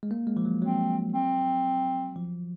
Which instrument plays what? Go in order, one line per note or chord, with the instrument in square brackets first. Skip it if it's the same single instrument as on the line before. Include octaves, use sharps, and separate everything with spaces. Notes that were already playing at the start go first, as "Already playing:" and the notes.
[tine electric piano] G#3
A#3
G#3
F3
F#3
[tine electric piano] F#3 [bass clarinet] C4
[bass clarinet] C4
[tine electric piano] F3